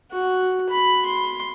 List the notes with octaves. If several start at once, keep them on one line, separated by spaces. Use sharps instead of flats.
F#4
B5
C6